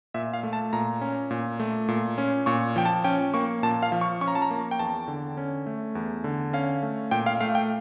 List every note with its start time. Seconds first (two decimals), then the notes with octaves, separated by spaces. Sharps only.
0.14 A#2 E5
0.33 F5
0.43 A3
0.53 A5
0.73 A#2 A#5
1.01 C#4
1.31 A#2
1.59 A3
1.88 A#2
2.18 C#4
2.46 A#2 C#6
2.76 F3 G5
2.86 A5
3.04 C#4 G5
3.34 A#3 C#6
3.63 A#2 A5
3.83 F5
3.92 F3
4.01 C#6
4.21 C#4 C#6
4.28 A#5
4.35 A5
4.42 A#5
4.51 A#3
4.71 G5
4.79 E2 A5
5.08 D3
5.37 C#4
5.66 A3
5.95 E2
6.24 D3
6.53 C#4 F5
6.83 A3
7.11 A#2 G5
7.26 F5
7.41 A3 F5
7.55 G5